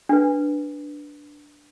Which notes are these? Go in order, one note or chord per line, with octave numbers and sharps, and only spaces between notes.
D4 B4